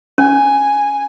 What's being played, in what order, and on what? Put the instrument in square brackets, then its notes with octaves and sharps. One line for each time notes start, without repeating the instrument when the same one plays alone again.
[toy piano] C#4 [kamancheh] G#5